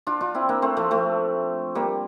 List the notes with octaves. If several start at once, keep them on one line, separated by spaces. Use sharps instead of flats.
D4 F4
D4 F4
C4 E4
A#3 D4
A3 C4
F3 A3
F3 A3
G3 A#3